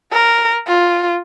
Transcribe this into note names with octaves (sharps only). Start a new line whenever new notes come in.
A#4
F4